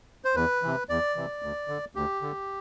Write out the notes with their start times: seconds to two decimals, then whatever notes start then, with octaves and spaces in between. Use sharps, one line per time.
0.25 C5
0.35 E2 B4
0.62 C3 E3
0.89 E2 D5
1.16 C3 E3
1.42 D2
1.68 D3
1.95 D2 G4
2.22 D3